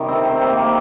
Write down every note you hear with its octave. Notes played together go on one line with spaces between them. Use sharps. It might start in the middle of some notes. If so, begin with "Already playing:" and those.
Already playing: C3 D#3 G3 A#4 C5
C4
C4
A#3
A#3